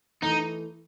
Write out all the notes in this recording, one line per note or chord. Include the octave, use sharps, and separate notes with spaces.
E3 A3 D#4